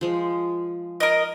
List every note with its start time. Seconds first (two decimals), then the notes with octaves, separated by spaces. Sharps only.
0.01 F3 G#3
1.00 A#4 D#5